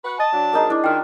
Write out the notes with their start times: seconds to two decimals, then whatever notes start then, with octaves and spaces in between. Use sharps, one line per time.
0.05 F#4 B4 F#5
0.20 D#5 A5 A6
0.33 F#3 D4
0.53 A#3 D#4 G#4
0.70 D4 E4 D6
0.84 D#3 F4 G5 F6